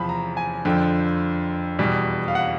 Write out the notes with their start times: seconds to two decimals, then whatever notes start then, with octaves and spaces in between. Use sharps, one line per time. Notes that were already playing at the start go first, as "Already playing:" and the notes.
Already playing: E2 C3 F3 A5 B5
0.09 A#5
0.37 G#5
0.65 F2 D3 F3 G5
1.79 E2 B2 G3
2.28 F5
2.35 F#5